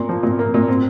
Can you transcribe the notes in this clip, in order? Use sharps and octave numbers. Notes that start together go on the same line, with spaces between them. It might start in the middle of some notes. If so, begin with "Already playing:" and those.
Already playing: A#2 A#3
F3
A#2
A#3
A#2
C4